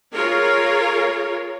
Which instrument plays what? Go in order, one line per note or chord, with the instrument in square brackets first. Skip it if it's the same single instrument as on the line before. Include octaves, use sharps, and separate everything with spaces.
[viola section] F4 G#4 A#4 C#5